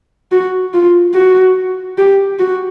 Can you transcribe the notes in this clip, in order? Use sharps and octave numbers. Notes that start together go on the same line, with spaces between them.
F#4
F4
F#4
G4
F#4